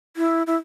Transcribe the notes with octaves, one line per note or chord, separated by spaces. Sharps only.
E4
E4